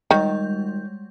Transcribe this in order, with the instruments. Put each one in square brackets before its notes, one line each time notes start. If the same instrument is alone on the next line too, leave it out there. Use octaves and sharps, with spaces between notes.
[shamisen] D#3 [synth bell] G3 G#3 G6